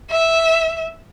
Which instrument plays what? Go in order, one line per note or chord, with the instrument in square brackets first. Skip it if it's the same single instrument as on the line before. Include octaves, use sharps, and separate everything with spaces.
[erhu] E5